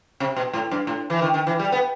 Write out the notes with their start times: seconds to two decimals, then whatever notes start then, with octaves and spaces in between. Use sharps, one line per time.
0.20 C3
0.36 B2
0.53 A2
0.71 G2
0.87 A2
1.10 E3
1.22 D#3
1.34 D#3
1.47 E3
1.59 G3
1.72 B3